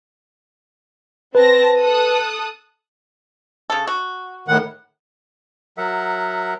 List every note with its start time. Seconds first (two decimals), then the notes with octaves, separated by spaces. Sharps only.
1.35 C4 B4 A5 A#6
1.78 A4 D#6 F#6
3.70 C#3 A4
3.87 F#4
4.48 A2 D#3 F#5
5.78 F#3 A#4 E5 F#5